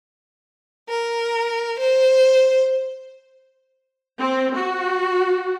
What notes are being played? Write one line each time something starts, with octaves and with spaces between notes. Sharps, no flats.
A#4
C5
C4
F#4